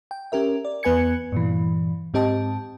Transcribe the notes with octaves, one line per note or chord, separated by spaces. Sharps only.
G5
C#4 G4 A#4 E5
D5
E2 B3 B4 G#5 G#6 C#7
G2 A#2 E3
G#2 C4 G4 D#5 A5